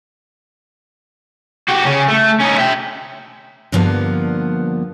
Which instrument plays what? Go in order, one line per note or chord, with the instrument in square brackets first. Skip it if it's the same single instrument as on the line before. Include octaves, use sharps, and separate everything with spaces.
[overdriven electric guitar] F#4 G4
C#3 C#4
A3
C#4 D#4
E5 G5
[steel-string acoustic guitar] G2 D3 F3 A#3 B3